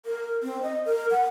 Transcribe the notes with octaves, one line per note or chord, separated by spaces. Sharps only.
A#4
C4
D#5
A#4
F#5